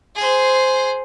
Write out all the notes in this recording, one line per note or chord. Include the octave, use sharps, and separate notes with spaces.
G#4 C5